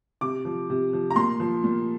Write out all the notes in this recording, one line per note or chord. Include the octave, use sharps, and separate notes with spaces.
C3 D6
F3
C3
F3
A#5
A#2 C6
F3
A#2